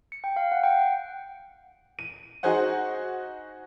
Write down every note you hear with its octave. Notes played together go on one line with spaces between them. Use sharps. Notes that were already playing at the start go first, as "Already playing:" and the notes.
C#7
G5
F5
F#5
G5
F#5
D#7
D#4 F#4 G#4 C5 F#5